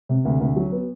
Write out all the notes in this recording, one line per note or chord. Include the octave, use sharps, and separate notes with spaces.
C3
D2
D2
F#3
B3